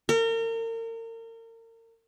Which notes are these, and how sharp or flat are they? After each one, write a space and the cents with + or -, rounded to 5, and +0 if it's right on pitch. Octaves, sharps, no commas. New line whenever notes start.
A#4 -35